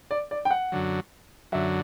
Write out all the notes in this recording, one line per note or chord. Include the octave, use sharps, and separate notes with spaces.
D5
D5
G5
F#5
F#2 D3 F#3
F#2 D3 F#3 E5